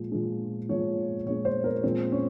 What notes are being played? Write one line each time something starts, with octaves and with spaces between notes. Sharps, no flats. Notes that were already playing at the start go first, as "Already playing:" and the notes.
Already playing: A#2 F3 G#3
A#2 F3 G#3
A#2 F3 G#3 C#5
A#2 F3 G#3 C#5
C5
A#4
A#2 F3 G#3 C4
C#4